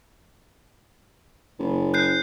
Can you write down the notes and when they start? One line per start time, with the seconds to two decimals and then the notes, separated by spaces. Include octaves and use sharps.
1.59 F#1
1.94 F#6 G6 C7